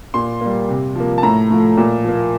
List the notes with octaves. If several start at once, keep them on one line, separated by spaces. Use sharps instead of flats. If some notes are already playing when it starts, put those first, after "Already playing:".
A#2 C6
G3 A#3
C3
F3 A#3
A5
A2 A#5
F3 A3
A#2
F3 A#3